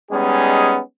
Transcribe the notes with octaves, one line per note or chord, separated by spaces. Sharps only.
G3 G#3 B3 C#4 D#4 G#4